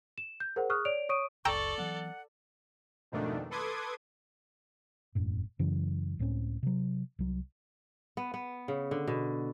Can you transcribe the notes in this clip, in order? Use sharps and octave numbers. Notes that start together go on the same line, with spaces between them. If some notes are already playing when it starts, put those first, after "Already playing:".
E7
G6
G#4 A#4 C5 F#5
G#4 C#6 D#6 F6 F#6
C#5 D5 D7 F7
C#5 C#6 D#6 D7 D#7
F#1 C#2 A4 D5 G5 A#5 C#6 E6
E3 F#3 B3 F#5
F2 G#2 B2 D#3 A3 D4
A4 B4 C6 D6 D#6 G#6
E1 F#2 A2
F#2 C#3 E3 F#3
C#2 A2 C4 C#4
C3 F#3
C2 F#3
B3
B3
C#3
D3
B2